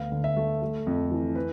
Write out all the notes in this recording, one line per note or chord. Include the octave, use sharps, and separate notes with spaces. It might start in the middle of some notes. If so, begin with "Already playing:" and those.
Already playing: D2 B3 F5
D3
E5
A3
A3
F2
E3
B4